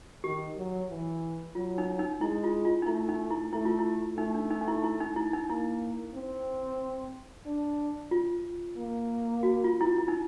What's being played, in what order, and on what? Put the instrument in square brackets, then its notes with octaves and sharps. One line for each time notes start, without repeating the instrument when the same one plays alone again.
[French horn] D#3 [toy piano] G4
[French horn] F#3
E3
[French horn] F#3 [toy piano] F4
[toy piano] D#4
D#4
[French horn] G#3 [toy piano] E4
[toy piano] F4
F4
D#4
[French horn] A3 [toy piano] E4
[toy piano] D#4
E4
[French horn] A3 [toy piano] E4
[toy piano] F4
E4
[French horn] A3 [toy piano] D#4
[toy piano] D4
D#4
D#4
E4
E4
D#4
E4
D#4
[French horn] A#3 [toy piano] E4
[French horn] C4
D4
[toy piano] F4
[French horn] A#3
[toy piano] F#4
F4
E4
F4
E4
D#4